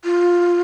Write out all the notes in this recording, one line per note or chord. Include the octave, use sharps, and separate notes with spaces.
F4